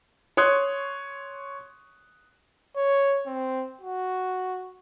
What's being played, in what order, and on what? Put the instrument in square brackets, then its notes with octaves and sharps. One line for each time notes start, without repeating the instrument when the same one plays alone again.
[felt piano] C#5 C6 C#6 D#6 F#6
[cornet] C#5
C4
F#4